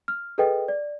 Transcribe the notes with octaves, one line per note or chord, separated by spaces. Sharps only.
F6
G#4 A4 B4 D#5 G5
D5